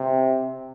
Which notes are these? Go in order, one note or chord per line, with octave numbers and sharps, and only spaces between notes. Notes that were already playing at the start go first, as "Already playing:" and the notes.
Already playing: C3